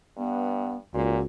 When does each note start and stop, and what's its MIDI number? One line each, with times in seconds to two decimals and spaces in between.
0.18 0.81 43
0.18 0.77 59
0.94 1.24 37
0.94 1.19 46
0.94 1.22 66